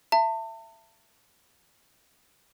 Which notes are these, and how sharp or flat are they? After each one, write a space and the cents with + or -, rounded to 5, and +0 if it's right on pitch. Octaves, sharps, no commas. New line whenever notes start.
E5 +25 A5 +40